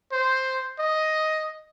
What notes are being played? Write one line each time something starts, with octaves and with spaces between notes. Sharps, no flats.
C5
D#5